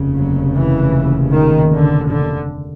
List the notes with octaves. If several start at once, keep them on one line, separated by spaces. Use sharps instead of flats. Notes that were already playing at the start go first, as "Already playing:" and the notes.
Already playing: F1 D#2 C#3
F#3
E3
D#3
D3
D3